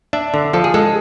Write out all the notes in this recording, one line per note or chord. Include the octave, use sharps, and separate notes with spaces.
D4 E5
D3
F3 A4
G#4
G#3 A4